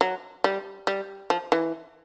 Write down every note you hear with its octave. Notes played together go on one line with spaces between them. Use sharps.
F#3
G3
G3
F3
E3